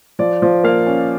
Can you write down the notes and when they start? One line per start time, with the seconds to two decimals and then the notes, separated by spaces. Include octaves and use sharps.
0.19 F3 D5
0.42 F3
0.63 A#3 F5
0.87 C#4